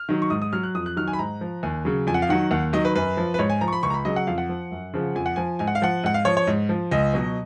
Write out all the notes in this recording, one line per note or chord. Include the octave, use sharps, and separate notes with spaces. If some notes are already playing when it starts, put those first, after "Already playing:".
Already playing: F6
D#3 F#3
C#6
G#2 D#6
D#6
F#3 F6
F#6
F2 D#6
F#6
D#3 F#3 F6
G#5
B5
G#2 A#5
F3
D#2 G#5
C#3 F#3
F2 G#5
F#5
F5
D#3 F#3 F#5
D#2 F#5
D#3 F#3 D#5
B4
F#2 B4
F3
B4
G#2 C#5
G#5
F3 A#5
C#6
B5
C#2 C#6
A#5
B5
C#3 F#3 D#5
F#5
F2 F5
F#5
F3
F#2
C#3 F3
F2 G#5
F#5
F3 G#5
G#2 G#5
F#5
F5
F3 F#5
G#2 F#5
F5
F3 C#5
C#5
G#2
F3
C#2 D#5
B2 F#3